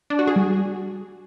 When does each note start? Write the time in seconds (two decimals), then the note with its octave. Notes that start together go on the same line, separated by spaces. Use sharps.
0.10 D4
0.19 F#4
0.27 G#4
0.36 G3